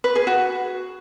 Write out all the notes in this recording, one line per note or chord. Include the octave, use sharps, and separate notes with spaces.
B4
G#4
F#4